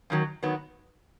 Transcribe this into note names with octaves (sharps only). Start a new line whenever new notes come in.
F#2 D#3 F#3
D#3 F#3 B3